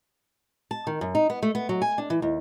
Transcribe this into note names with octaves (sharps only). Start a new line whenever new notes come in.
A5
D#3
F#2
D#4
B3
A3
B3
F#3
G#5
D4
E3
D#2